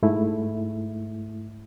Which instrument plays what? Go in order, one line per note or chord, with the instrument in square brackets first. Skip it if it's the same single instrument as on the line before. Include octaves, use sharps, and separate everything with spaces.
[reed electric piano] G#2 A3 E4